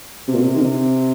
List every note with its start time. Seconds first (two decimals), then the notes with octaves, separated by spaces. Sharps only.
0.28 C3
0.34 A#2
0.41 C3
0.56 D#3
0.62 C3